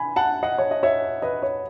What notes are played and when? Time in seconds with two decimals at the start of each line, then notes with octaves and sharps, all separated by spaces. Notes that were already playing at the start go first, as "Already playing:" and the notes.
Already playing: G#5 B5
0.16 F#5 A5
0.43 D#5 F#5
0.58 C#5
0.71 D#5
0.83 C#5 E5
1.22 B4 D#5
1.43 C#5